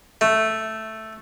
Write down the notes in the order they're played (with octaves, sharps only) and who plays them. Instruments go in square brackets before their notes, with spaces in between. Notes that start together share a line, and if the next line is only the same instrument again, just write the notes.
[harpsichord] A3